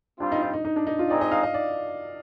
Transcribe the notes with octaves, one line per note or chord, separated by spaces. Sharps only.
G3 C4 D4 F4
D#4
D#4
D#4
D#4
D4
D#4
F4
G#3 C4 D#4 D5
D#5
F5
D#5
D5